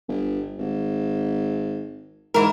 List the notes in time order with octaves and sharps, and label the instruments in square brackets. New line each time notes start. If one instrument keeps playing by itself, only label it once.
[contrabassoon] G1
G#1
[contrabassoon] G#2 [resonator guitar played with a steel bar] E3 A#4